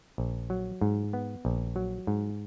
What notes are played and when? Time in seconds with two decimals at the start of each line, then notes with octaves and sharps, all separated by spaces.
0.18 A#1
0.50 F#3
0.81 G#2
1.13 B3
1.45 A#1
1.76 F#3
2.07 G#2